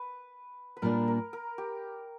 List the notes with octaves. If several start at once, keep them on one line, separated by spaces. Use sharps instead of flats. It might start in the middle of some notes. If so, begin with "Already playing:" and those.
Already playing: B4
B4
A#2 G3 A#3 D4 A#4
A#4
A#4
G4